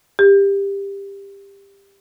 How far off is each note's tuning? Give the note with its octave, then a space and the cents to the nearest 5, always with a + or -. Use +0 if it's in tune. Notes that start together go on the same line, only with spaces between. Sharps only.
G4 +20